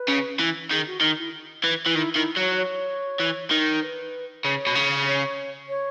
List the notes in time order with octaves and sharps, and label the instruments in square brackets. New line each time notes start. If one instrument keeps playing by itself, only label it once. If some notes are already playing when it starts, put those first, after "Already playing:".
Already playing: [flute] B4
[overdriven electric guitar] C#3
E3
[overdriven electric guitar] D#3 [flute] G#4
[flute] F#4
[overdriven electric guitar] D#3 [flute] D#4
[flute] E4
[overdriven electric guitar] E3
E3
[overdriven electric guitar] D#3 [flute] E4
[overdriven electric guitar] D#3 [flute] E4
[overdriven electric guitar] F#3 [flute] C#5
[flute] C#5
[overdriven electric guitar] E3
D#3
[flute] B4
[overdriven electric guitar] C#3 [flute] C#5
[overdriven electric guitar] B2
C#3
[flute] C#5
C#5